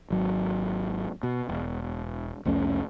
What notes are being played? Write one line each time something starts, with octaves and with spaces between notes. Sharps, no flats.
G#1 F#3
B2
E1
C2 F2 A3 C#4